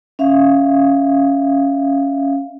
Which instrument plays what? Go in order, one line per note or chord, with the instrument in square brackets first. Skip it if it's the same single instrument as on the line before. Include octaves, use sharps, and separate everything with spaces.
[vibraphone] C#4 E5 F5